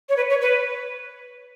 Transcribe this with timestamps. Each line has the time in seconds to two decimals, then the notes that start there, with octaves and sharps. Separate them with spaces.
0.09 C#5
0.17 B4
0.30 C#5
0.42 B4